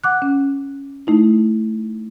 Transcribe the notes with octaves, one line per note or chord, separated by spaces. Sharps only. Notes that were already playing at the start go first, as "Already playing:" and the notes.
F#5 D6 F#6
C#4
A3 D#4 E4